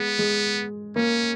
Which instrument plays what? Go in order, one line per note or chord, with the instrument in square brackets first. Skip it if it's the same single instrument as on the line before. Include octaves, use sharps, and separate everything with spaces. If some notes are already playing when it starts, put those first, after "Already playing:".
Already playing: [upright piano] G#3 [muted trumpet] B3
[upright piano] G#3
[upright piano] A#3 [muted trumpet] C#4